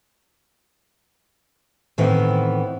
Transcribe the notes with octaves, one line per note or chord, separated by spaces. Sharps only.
A2 D#3 E3 B3 C4 E4